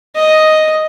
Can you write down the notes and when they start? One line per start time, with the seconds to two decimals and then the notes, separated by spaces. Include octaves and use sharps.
0.16 D#5